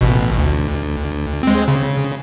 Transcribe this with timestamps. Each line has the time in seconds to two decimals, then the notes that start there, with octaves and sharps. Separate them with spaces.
0.01 A1 B2
0.38 D2
1.43 G#3 C4
1.68 C#3